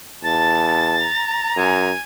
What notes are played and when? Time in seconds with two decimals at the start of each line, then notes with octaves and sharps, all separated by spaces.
0.24 E2 A5 A6
1.01 A#5
1.56 F#2 G#5